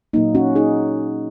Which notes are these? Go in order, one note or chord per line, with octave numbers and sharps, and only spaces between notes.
A#2 F#3 A#3 D#4
C#4 F#4
D#4 G#4